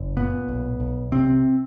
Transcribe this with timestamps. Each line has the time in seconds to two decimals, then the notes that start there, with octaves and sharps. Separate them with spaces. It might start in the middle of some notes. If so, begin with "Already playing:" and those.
Already playing: F#1
0.17 A#2 B3
0.48 B1
0.80 B1
1.12 C3 C4